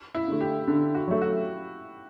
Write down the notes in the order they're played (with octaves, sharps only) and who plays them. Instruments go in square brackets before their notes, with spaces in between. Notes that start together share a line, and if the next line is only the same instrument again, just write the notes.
[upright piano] E4
[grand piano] D3 A3
[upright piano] G4
[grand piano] D3
[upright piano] F#4
[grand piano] F#3 A3
[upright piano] F#4